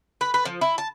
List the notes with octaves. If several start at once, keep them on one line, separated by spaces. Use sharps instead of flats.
B4
B4
F3
E4
A5